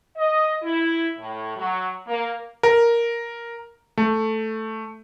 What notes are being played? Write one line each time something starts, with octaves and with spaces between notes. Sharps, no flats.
D#5
E4
A2
F#3
A#3
A#4
A3